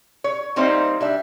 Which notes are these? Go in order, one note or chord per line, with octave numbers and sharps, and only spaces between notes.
C#5
G3 A#3 C4 D#4 C5 E5
G3 D4 E5